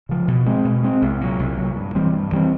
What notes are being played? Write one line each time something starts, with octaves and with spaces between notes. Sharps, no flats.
C#3 F3
B2
G#3 C4
B2
G#3 C4
C2
A#2 F#3
C2
A#2 F#3
G2
E3 G3 C4
G2
E3 G3 C4